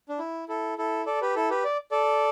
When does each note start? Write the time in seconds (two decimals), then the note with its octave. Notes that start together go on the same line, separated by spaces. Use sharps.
0.09 D4
0.19 E4
0.48 E4 A4
0.78 E4 A4
1.06 A4 D5
1.21 G4 B4
1.36 E4 A4
1.50 G4 B4
1.64 D5
1.92 A4 D5